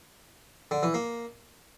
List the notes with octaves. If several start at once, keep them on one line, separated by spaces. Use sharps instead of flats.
D3
E3
A#3